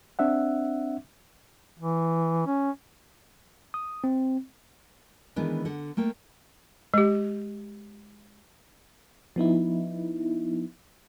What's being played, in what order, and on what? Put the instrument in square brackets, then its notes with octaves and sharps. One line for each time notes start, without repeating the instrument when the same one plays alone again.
[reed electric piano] C4 D4 E5 F#5
[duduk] E3
C#4
[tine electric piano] D#6
C4
[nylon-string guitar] D#3 E3 G#3 B3 D4
D3 F#5
A3 A#3 G5
[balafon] G#3 G4
[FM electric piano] F3 B3 D#4 E4